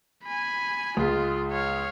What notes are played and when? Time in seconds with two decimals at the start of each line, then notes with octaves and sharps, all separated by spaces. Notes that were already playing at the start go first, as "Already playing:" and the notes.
0.24 G#5 B5
0.97 C#2 G#3 F4 G#4
1.52 C#5 F5